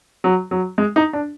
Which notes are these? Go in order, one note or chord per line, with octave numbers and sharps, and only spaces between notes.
F#3
F#3
G#3
D#4
D4